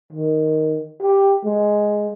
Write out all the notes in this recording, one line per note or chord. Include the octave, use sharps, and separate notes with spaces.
D#3
G4
G#3